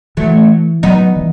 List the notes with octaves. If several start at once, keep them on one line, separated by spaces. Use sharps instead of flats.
E3 F#3 A3
F#3 B3 D#4
E3